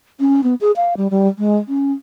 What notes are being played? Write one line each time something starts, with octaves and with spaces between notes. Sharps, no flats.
C#4
B3
G#4
F5
G3
G3
G#3
C#4